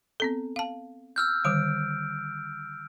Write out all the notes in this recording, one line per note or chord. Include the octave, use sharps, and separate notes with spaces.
B3 C4 A4
F5 A5
E6 F6 G6
D3 D#3 G3 D7